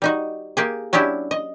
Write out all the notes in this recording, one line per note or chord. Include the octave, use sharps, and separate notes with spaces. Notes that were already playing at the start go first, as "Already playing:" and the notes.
G3 D#4 F#4
A#3 G4 G#4
F#3 C#4 D4 E4 G4
D#5